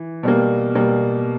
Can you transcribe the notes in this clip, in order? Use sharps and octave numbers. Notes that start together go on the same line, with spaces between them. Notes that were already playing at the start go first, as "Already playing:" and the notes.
Already playing: E3
B2 G3 A#3
B2 G3 A#3